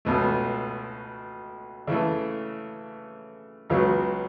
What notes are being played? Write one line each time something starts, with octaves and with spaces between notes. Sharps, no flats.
C#2 B2 A3
C#3 E3 A3
C#2 C#3 F#3 B3